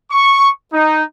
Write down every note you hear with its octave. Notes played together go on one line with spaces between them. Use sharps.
C#6
D#4